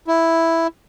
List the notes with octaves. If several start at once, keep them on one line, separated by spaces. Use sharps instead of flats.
E4